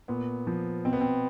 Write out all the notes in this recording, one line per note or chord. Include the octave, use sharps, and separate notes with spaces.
A#2 B3
F3
B2 C4
B3
C4